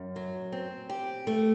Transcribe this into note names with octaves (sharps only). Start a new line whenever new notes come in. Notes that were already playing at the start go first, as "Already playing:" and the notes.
Already playing: F#2
F#3
C4
G4
A3